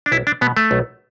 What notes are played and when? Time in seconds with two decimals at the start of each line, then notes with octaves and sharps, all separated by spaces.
0.06 D4
0.12 B1 E4
0.27 D4
0.41 B2 B3
0.57 A3
0.71 B1